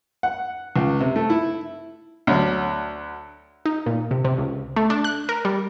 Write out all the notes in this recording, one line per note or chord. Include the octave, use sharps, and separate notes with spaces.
F#5
C#2
C3
A3
E4
D2 F#3
D#4
A#2
C3
C3
C#2
A3
D4
F#6
A#4
G3